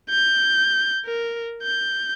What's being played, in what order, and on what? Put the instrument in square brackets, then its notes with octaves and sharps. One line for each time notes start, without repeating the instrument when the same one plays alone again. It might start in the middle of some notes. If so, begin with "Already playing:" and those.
[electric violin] G6
A#4
G6